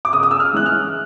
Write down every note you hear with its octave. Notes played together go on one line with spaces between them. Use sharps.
D6
C#3 D#6
D#6
E6
F6
E3 G#3 C#4 F#6
F6